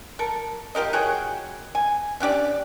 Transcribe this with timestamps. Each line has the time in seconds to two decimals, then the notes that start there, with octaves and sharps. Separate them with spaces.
0.19 A4 A#4
0.75 F4 G4 A#4 D#5
0.93 F#4 G#4 C#5 G5
1.75 G#5
2.20 C#4 D4 G4 D5